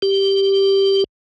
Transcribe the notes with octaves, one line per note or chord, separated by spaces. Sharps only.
G4